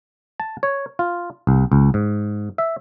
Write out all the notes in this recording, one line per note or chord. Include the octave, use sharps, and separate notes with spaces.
A5
C#5
F4
C2
C#2
G#2
E5